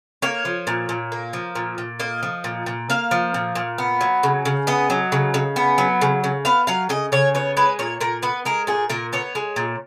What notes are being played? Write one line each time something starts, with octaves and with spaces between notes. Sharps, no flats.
A#3 C#5
F3
A#2
A#2
A#3
F3
A#2
A#2
A#3 D#5
F3
A#2
A#2
A#3 F5
F3
A#2
A#2
B3
F#3
C#3
C#3
B3 D#5
F#3
C#3
C#3
B3
F#3
C#3
C#3
B3 F5
F#3 F5
C#3 D#5
C#3 C#5
B3 C#5
G#3 B4
A#2 C#5
A#2 A#4
B3 B4
G#3 A#4
A#2 G#4
A#2 A#4
B3 C#5
G#3
A#2